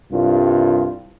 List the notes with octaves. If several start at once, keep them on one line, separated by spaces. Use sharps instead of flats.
C2 G2 F4